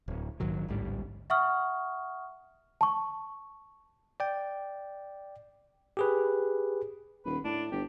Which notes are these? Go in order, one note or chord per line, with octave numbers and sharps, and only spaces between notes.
D1
A#1 G#2 D#3 F#3
A1 D2 G#2 G3
E5 F#5 C#6 D#6 F6
A5 C#6
D5 G5
G4 G#4 B4
D#1 B4
A2 D4
G1 G4